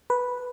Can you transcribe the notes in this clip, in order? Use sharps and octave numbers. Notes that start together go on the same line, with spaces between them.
B4